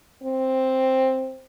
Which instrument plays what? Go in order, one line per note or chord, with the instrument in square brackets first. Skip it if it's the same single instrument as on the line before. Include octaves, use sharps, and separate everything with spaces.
[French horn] C4